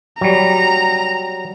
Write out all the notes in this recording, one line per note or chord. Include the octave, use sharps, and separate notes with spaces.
F#3 G3 A#5